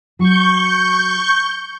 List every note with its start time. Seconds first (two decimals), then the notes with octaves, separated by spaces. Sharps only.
0.19 F#3 F#4 C#6 G6